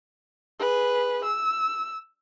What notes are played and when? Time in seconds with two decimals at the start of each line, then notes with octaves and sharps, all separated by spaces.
0.59 G#4 B4
1.24 E6